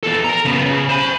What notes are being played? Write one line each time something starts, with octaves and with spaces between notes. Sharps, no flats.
E2 A4
A#4 A#5
C#3 B3
C#3
C5 B5